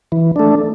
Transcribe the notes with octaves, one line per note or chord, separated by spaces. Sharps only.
E3
A3 D4